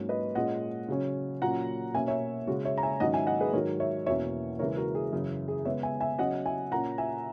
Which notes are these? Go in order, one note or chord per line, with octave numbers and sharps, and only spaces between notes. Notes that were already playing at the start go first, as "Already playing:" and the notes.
Already playing: G#2 F#3 A#3 C#4
B4 D#5
A#2 G#3 C#4 D#5 F#5
C#3 F#3 C#4
A#2 F#3 C#4 F#5 A#5
B2 A#3 C#4 E5 G#5
C#5 E5
C#3 G#3 C#4 F#4
C#5 E5
A#5
E5 G#5
G#2 D#3 F#3 C#4 D#5 F#5
E5 G#5
D#5 F#5
G#4 B4
G#2 D#3 F#3 A#4 C#5
C#5 E5
E2 B2 A#3 C#4 C#5 E5
C#3 E3 G#3 A#4 C#5
F#4 A#4
G#4
F#2 C#3 E3 G#4
G#4
C#3 G#3 B3 C#5 E5
E5 G#5
E5 G#5
C#3 F#3 C#4 D#5 F#5
E5 G#5
A#2 A#3 C#4 F#5 A#5
E5 G#5